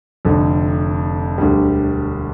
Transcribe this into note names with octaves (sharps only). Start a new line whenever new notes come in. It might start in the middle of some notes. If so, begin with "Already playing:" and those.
F1 F2 D3
E1 D2 D3 G3